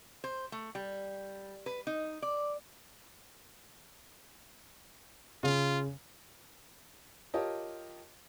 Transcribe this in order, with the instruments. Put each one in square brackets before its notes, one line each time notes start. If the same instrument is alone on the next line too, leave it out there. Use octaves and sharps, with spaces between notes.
[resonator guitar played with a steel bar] C5
A3
G3
B4
D#4
D5
[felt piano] C#3 [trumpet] F4
[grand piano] F4 G4 A#4 C#5 D#5 A5